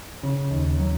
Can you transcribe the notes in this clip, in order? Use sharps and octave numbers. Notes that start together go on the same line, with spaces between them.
C#3
D#2
F#3